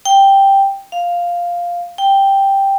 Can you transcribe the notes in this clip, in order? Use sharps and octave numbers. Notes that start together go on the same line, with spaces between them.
G5
F5
G5